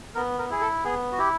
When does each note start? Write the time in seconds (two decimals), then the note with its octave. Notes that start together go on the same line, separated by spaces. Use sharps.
0.15 B3 A#4
0.39 A#4
0.50 E4 G#4
0.61 A4
0.84 B3 G#4
1.12 F#4
1.18 E4 G4